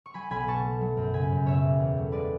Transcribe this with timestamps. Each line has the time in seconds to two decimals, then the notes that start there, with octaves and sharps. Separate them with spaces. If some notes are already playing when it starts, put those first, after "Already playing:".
0.06 C#6
0.14 F#3 G#5 B5
0.30 B1 G#5 B5
0.48 B2 A5 C#6
0.64 A3
0.81 F#3
0.97 F#2
1.13 C#3 G#5 B5
1.31 F#2
1.45 B2 C#5 E5
1.63 F#1
1.80 E2
1.97 A3
2.12 G#3 B4 D5